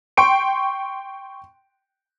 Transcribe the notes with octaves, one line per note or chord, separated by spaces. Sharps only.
G5 C6 C#6 D7